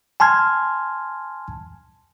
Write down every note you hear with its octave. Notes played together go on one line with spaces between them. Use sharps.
G#5 A5 C6 F6 G#6